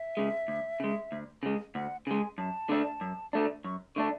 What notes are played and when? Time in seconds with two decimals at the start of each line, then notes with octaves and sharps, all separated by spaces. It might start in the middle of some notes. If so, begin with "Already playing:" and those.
Already playing: E5
0.17 C#3 G#3
0.48 D2
0.80 C#3 G#3
1.12 D2
1.43 C#3 G#3
1.75 D2 F#5
2.06 C#3 G#3 G#5
2.38 F#2 A5
2.69 D3 A3 D4
3.01 F#2
3.33 D3 A3 D4
3.65 F#2 C#6
3.95 D3 A3 D4 C#6